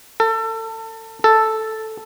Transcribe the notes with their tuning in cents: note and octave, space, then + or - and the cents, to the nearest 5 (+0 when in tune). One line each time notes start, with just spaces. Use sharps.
A4 +30
A4 +0